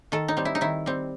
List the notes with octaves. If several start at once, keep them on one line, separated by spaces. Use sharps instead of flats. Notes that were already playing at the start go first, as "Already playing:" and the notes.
D#3 A4
D#4
G3 C4
E4
D#4
D#3 E4
G3 C4